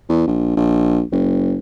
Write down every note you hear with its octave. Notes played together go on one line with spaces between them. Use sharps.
E2
A#1
A#1
F#1